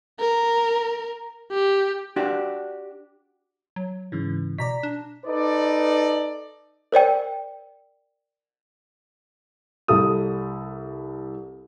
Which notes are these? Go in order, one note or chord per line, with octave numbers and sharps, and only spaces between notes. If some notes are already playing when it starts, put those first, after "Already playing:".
A#4
G4
D4 F#4 G4
F#3
G#2 C#3 E3
B2 D5 A#5 B6
D4
D#4 A4 B4 D5
A#4 C5 D5 G5
C2 A4 D#6